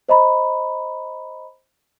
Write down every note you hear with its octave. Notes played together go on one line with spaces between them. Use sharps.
C5 D#5 A#5 B5